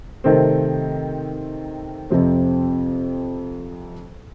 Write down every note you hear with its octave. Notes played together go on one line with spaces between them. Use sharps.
C3 D#3 A3 C4
F2 C3 F3 C4